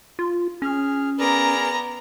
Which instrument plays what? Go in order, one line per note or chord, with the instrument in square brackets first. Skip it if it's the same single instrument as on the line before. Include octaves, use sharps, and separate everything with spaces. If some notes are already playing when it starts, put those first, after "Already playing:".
[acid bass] F4
[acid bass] C#4 [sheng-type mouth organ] G#4 F6
[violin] B3 A#5 [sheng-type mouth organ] G#4 A#4 D5